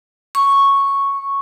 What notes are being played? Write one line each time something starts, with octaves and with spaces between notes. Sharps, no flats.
C#6